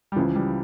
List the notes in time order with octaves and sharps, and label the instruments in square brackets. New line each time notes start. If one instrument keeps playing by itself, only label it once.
[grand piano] G3
[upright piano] C#2 C#3 E3 [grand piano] F3
[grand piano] G3